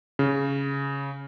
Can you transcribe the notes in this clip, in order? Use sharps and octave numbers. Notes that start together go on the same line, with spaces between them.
C#3